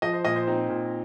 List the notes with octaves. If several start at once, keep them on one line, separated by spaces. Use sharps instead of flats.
F3 D#5
C5
A#2 D#5
C5
C4 D#4
A#2